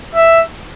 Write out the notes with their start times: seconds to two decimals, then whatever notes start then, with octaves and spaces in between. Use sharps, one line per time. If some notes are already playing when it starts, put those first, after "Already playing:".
0.15 E5